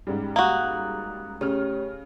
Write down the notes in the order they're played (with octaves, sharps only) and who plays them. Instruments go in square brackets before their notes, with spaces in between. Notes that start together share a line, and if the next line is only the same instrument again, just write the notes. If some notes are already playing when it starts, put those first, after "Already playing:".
[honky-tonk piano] G#2 C#3 G3
[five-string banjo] A#3 F#4 [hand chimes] A#5 D#6 F#6
[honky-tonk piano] C#3 F6 [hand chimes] A3 G4 C#5